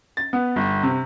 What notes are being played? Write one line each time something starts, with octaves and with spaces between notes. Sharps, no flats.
A6
B3
G1
C3